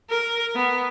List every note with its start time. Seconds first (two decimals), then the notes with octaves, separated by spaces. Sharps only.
0.10 A#4
0.55 B3